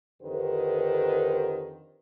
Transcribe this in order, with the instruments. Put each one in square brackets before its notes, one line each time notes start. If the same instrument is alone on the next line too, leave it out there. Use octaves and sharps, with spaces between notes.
[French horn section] F2 D3 D#3 G4 B4 C5